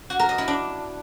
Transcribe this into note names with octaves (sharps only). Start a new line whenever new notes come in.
F#4
A#4
D#5
E4
D4